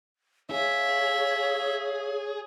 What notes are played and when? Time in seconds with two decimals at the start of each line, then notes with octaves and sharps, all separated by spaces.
0.51 G#4 C#5 E5 F5